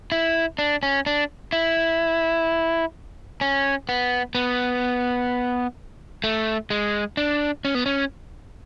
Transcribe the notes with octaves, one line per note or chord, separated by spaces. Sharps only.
E4
D4
C#4
D4
E4
C#4
B3
B3
A3
G#3
D4
C#4
B3
C#4